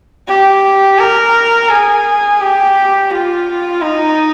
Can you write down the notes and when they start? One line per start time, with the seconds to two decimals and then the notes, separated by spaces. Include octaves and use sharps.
0.28 G4
0.99 A#4
1.70 G#4
2.40 G4
3.11 F4
3.82 D#4